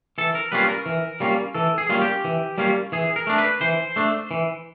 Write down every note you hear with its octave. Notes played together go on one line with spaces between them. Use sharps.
E3 A4
A#4
G3 A#3 C#4 F4 B4
A#4
E3
G3 A#3 C#4 F4
E3 A4
G#4
G3 A#3 C#4 F4
G4
E3
G3 A#3 C#4 F4
E3 G#4
A#4
A3 D4
B4
E3 C5
A3 D4
E3